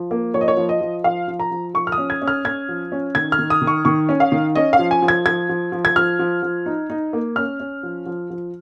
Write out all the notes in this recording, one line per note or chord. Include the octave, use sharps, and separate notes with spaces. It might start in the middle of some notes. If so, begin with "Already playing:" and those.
Already playing: F3
A#3
F3 C#5
D#5
C#5
F3
D#5
F3
F3 F5
F3
A#5
F3
F3 C#6
F6
D#6
C#4
G#6
C#4
F6
C#4 G#6
F3
C#4
D#3 G#6
F6
D#3
D#6
D#3
C#6
D#3 C#6
C#4
F5
D#3
C#4 D#5
F5
F3
G#5
F3
G#6
F3 G#6
F3
F3
G#6
F3 F6
F3
F3
D#4
D#4
A#3
C#4 F6
C#4
F3
F3
F3